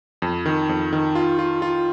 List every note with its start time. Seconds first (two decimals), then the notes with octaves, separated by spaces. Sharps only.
0.22 F2
0.46 D#3
0.69 F2
0.93 D#3
1.15 F4
1.39 F4
1.62 F4